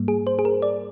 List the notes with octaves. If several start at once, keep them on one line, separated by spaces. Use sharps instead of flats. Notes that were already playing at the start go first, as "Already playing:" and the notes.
Already playing: G#2 G3 A#3
G#4
C5
G#4
A#4
D5